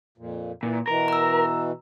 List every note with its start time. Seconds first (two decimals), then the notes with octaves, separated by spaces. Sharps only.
0.18 F2 A#2
0.63 A#2 E3
0.88 B2 E3 A#4
1.08 A#5 E6